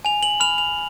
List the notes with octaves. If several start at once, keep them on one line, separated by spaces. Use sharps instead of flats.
G#5 F7
F#7
B5 F6 F7
F7